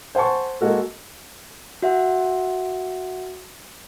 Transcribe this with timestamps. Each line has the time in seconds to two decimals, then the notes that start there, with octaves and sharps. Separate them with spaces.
0.15 C5 F#5 G#5 A5 C#6
0.61 G#3 A#3 F#4 A4
1.82 F#4 E5 F#5